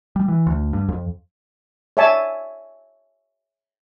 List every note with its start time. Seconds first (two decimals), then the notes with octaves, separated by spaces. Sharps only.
0.16 G3
0.28 E3
0.47 D2
0.73 G2
0.89 F2
1.97 C#5 D5 E5 G#5 A5